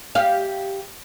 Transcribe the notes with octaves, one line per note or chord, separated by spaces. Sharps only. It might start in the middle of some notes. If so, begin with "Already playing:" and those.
G4 F5